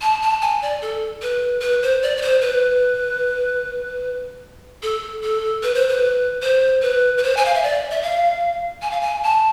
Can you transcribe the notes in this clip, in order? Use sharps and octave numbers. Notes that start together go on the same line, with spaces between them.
A5
A5
G#5
D5
A4
B4
B4
C5
D5
D5
C5
B4
A4
A4
B4
C5
B4
C5
B4
B4
C5
G#5
F5
E5
D5
E5
F5
G#5
F5
G#5
A5